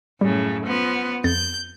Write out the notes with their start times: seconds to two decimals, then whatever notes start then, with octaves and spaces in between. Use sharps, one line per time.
0.21 F#2 A2 C#3 G3
0.65 F3 B3
1.24 F2 G6 A6